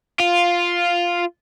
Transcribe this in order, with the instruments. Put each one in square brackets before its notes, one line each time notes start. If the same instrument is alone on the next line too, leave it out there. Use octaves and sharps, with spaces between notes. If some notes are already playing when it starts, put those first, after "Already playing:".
[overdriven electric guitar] F4